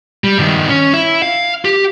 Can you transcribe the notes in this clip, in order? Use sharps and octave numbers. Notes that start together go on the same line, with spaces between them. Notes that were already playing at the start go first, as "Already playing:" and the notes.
G3
G2 D#3
C#4
E4
F5
G4